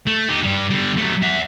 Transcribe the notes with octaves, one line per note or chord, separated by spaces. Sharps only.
A3
D#4 G4
G2 G3
D3 G3
F#3 A3
E5 F#5